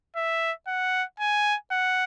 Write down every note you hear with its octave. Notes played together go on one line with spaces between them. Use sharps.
E5
F#5
G#5
F#5